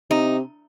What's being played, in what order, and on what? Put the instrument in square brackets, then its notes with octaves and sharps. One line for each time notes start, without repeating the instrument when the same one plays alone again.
[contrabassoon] C3 [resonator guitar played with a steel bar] D#4